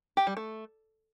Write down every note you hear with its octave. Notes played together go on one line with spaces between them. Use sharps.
G4
G3
A3